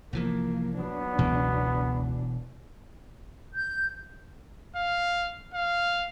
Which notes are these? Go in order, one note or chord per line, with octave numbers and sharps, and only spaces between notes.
C2 E3 F3 A#3
F#3 B3 D4
E1 C#2 B2 E3
G6
F5
F5